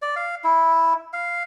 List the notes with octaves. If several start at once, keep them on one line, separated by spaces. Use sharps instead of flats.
D5
F5
E4
F5